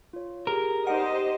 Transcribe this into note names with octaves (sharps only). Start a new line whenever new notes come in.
F4 C#5
G4 G#4 A#4
D#4 G4 C5 D5 D#5 F#5 D7